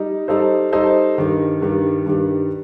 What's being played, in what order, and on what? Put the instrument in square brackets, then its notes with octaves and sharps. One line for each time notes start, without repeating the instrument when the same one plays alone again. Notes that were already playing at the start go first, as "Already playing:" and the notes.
Already playing: [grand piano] G3 D#4
G3 D#4 A4 C5
G3 D#4 A4 C5
G2 D#3 G3
G2 D#3 G3
G2 D#3 G3